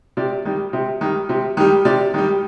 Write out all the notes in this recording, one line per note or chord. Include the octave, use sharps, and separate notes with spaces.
C3 D5
D#3 G3
C3
D#3 G3
C3
D#3 G3
C3 D5
D#3 G3